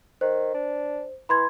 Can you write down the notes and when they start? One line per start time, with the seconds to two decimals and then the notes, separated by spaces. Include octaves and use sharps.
0.21 D#3 C5
0.54 D4
1.29 E3 B5 C6 G#6